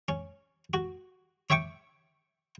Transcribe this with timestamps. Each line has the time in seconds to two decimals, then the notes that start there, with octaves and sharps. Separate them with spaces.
0.08 C#4
0.74 F#4
1.50 C#5 E5 G5 C#6 D6